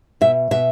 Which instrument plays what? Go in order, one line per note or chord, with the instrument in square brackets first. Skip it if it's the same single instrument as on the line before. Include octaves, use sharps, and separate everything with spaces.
[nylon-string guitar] B2 E5
B2 E5